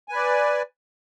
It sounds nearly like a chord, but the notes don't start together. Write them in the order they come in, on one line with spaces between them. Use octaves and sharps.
G#5 B4 D5